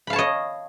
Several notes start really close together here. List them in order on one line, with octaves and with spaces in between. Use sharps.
B5 F5 A5 C#5 D#5